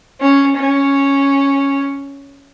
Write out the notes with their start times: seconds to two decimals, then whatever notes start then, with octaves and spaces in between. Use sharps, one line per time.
0.20 C#4
0.56 C#4